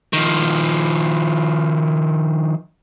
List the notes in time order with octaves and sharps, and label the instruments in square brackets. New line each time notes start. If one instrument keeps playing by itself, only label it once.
[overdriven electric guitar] D#3 F3